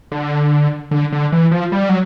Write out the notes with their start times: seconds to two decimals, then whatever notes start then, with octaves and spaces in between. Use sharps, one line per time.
0.12 D3
0.91 D3
1.12 D3
1.32 E3
1.51 F3
1.72 G3
1.89 F#3